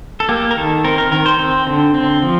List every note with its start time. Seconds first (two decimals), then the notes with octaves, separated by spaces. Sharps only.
0.20 A4
0.29 A#3 G4
0.51 A#4
0.57 D#3 A4
0.85 C4 A#4
0.98 A#4
1.12 D#3 A#4
1.26 C5
1.39 C4
1.67 D3
1.95 C4
2.22 F3